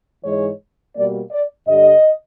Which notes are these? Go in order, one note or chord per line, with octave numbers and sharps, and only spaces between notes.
G#2 E3 G#3 C#5
B2 G3 A#3 D5
D5
G2 D3 G3 D#5